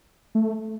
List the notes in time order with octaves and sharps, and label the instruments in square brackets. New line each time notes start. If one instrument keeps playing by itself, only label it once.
[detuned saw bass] A3